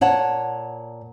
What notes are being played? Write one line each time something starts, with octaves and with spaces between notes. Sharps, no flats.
A#2 C#5 F#5 A5